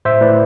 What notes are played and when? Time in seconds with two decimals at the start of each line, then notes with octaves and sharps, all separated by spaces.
0.05 A2 C5 E5
0.21 A2 B4 D5